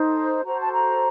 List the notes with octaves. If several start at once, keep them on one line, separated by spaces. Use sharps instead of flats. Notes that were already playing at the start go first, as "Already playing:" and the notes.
Already playing: D#4 A4 C5
F#4 A4 C5 A#5
A5
A#5